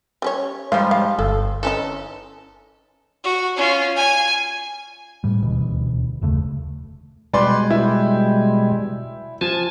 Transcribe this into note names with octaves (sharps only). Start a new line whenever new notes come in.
G3 C#4 C#5
G#2 F3 G3 C5 F5
F5
G1 A4
E3 C#4 D#4 A4
F#4
C#4 F4
G#5
A2 G3
D#1 D2 B2 E3
F#1 D#2 C#3 A3
B2 G3 G#3 B4 D5 C6
E4
F3 G#5 A5